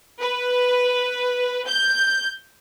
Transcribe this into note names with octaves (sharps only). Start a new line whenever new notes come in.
B4
G6